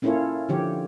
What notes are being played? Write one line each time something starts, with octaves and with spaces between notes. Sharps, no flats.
A#3 C#4 E4 F4 A4 C#5
D3 F3 G4 C#5